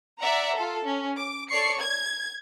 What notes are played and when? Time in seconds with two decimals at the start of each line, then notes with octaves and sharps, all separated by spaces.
0.19 D5 E5 F#5 A#5
0.55 F4 A4
0.84 C#4
1.17 D6
1.49 A4 C#5 D5 C#6 C7 C#7
1.80 G#6